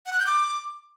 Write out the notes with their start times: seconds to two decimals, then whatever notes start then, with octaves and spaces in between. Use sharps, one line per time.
0.06 F#5
0.13 F#6
0.20 G6
0.27 D6